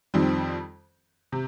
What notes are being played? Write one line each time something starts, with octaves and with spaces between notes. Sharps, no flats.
F2 D#3 G3 C4
C3